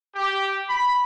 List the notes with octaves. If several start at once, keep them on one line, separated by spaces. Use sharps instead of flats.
G4
B5